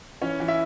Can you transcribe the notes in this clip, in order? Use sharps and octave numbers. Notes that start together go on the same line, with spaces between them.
E3 C#4 C#5
E3
E4 E5